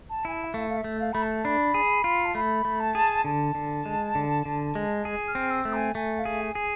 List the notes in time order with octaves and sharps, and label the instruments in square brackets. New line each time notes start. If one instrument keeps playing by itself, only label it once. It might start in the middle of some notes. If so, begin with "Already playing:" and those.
[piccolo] A5
[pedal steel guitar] E4 [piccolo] G#5
[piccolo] A5
E5
[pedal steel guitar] A3 [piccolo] F5
[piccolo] F5
E5
[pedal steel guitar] A3
[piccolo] F5
[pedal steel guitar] A3 [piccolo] B5
[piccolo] A5
[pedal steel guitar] D4 [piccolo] B5
[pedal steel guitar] G#4
F4
[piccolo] A5
[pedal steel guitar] A3 [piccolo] B5
[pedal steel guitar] A3
[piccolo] A5
[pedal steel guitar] G#4
[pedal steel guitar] D3 [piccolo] A5
[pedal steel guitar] D3
G#3
D3
D3
G#3
G#4
[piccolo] F6
[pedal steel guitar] C4
[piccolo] E6
[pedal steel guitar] A3
[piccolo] G#5
[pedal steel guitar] A3 [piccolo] G#5
[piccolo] F5
[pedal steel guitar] G#4
[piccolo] G#5
[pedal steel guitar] G#4